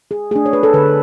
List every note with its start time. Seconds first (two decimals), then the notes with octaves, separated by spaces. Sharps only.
0.11 G#4
0.31 A3 D4 G#4
0.46 C#5
0.53 B4
0.63 A4
0.74 D3 B4